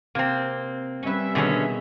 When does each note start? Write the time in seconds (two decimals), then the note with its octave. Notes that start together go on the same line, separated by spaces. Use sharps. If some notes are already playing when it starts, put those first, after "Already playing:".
0.15 C3 A#3 C4
1.03 C3 G3 C#4 B4 E5
1.35 B2 D3 D#3 C#4 G#4